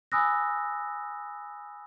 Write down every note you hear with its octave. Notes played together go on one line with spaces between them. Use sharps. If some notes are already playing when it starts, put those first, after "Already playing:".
G#5 B5 D#6 E6 F#6 A#6